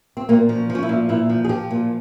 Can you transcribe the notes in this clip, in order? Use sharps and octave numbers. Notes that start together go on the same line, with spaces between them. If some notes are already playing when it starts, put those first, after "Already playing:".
C4
A#2 A#3
F3
C#4
F3
C#4
E4
A#2
A#2 E4
F3
G#4
F3 G4
A#2